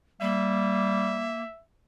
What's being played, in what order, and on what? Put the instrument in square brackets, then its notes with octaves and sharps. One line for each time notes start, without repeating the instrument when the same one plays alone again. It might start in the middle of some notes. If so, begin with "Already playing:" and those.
[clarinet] G3 [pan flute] A#3 [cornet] E5